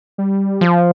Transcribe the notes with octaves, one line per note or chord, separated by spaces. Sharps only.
G3
F3